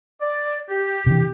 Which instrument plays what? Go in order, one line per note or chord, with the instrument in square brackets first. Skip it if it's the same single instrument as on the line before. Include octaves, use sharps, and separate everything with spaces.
[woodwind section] D5
G4
[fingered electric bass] C3 E3